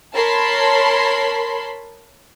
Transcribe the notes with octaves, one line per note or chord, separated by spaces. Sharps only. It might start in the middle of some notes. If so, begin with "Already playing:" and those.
A#4 C#5 A5 B5 C6